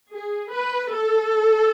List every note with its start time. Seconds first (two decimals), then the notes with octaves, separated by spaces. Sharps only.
0.12 G#4
0.52 B4
0.92 A4